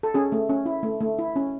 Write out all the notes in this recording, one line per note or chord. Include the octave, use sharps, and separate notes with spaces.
A4
C#4 G#4
A3
C#4
E4
A3
A3
E4
C#4